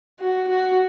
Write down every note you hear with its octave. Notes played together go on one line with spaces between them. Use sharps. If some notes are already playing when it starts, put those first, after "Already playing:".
F#4
F#4